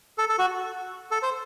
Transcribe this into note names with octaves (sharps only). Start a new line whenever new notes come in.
A4
A4
F#4
A4
C5